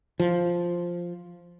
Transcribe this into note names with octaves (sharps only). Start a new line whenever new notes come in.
F3